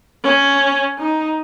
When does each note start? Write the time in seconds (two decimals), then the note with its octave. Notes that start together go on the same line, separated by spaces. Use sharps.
0.24 C#4
0.98 D#4